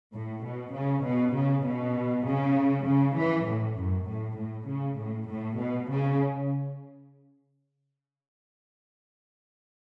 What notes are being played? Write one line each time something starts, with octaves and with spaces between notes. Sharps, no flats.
A2
B2
C#3
B2
C#3
B2
C#3
C#3
E3
A2
F#2
A2
A2
C#3
A2
A2
B2
C#3